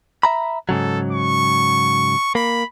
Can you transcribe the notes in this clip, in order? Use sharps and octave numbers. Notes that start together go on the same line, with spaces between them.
E5 A#5 B5
G#2 C#3 F#3 A4
C#6
A#3 B5